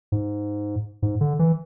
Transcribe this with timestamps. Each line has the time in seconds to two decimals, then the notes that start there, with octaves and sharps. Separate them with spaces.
0.12 G#2
1.02 G#2
1.21 D3
1.39 E3